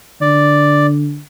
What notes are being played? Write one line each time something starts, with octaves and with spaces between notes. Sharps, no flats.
D3 D5